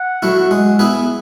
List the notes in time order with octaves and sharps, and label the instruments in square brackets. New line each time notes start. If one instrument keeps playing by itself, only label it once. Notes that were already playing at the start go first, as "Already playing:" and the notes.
Already playing: [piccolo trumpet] F#5
[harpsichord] F#3 A3 E4
G#3
B3 E4 G#4 B4